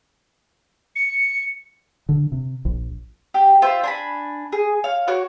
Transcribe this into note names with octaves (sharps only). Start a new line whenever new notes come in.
C#7
D3
C3
A#1
G4
F4 C5 E5
D4 G#5 B5
G#4
C#5 F5
F#4 C#5 C#6 D6